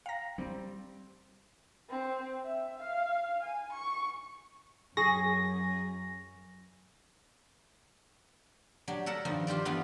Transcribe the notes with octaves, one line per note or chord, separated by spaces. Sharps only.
F5 G5 A#5 A#6
G3 C4
C4
E5
F5
G#5
C#6
F#2 G#4 G#5 C#6 A#6
F#3 D4 G4
A4 A#4 F#5 A5
G2 D#3 F3 D#4
F4 G4 C5 D5
E3 G3 B3 D4 F4